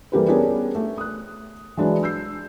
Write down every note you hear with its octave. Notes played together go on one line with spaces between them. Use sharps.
E3 G3 A#3 G4 A4 B4
B3 C#4 D4 G4 G#4 A#4
A3
D#6 F#6
E3 F#3 G#3 D4
E6 G6 C7